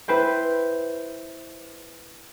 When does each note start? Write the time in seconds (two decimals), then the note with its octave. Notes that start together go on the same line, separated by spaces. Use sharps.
0.08 E4 B4 C5 G5